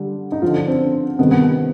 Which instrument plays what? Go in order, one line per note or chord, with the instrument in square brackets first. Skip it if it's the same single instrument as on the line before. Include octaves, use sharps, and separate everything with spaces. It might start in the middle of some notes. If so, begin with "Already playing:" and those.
Already playing: [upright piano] D3 G3
D#4
D3 F3 F4
D4
C4
C3 D#3 G3 B3
B3
B3